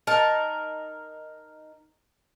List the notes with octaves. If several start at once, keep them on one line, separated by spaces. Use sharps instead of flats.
D#4 A#4 A5